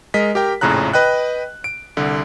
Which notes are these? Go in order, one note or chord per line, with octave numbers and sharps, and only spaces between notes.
G#3 A#4 D#5 B6
G4 A#4 G5
A#1 F2 A2 C#3 A#5 F#6
B4 D#5 G5 F#6
D7
C2 D3